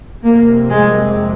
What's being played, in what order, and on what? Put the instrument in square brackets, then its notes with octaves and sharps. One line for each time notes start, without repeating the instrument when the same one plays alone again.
[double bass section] F2 C3 A#3
G#3